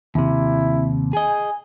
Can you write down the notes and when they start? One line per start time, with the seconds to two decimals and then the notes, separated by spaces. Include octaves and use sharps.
0.15 D#2 C3 E4
1.13 G#4 D#5 G#5